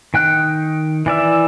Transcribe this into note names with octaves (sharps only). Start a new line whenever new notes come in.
D#3 G5 F#6
E3 D5 E5